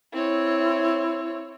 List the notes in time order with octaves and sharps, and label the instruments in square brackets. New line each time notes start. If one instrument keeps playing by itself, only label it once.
[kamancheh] C4 C#5 [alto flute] E4